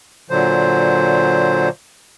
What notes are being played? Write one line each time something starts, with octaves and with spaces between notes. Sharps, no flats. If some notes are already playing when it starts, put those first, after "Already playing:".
A#2 D3 F#3 C5